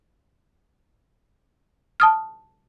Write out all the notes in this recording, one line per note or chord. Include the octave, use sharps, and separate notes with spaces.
A5 D#6 F6